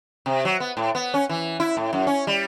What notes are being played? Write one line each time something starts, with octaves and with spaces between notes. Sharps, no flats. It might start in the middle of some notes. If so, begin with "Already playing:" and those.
C3
F#3
B3
A2
B3
C#4
E3
E4
A2
F#2
C#4
G3